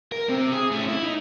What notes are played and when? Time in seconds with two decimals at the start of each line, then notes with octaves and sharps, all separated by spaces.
0.12 A#4
0.29 C3 C4
0.52 G#4
0.72 A3 C#4
0.88 E4
1.03 D#4